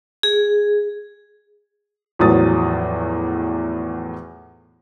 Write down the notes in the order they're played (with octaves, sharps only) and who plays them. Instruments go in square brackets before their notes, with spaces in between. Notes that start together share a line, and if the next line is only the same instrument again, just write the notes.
[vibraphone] G#4
[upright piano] E2 A2 F3 F#3 D#6 A6